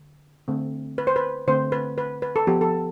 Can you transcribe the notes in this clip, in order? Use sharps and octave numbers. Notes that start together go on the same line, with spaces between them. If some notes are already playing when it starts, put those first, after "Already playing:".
Already playing: D3
D3 A3 C4
B4
C5
B4
D3 A3 C4 C5
B4
B4
B4
A4
F3 B3 G4
A4